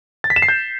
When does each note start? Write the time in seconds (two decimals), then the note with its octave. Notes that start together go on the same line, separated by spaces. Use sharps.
0.24 A6
0.30 B6
0.36 E7
0.42 C7
0.48 G6